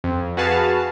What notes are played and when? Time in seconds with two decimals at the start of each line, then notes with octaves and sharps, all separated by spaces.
0.04 F2
0.37 F#4 G#4 B4 F5 A5